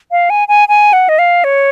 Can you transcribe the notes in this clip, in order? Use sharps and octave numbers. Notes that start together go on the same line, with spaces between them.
F5
G#5
G#5
G#5
F#5
D#5
F5
C#5